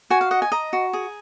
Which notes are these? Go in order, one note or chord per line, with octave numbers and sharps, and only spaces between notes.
F#4 G#5
F5
D#5 F#5
G#5
D#5 A#5
F#4
G#4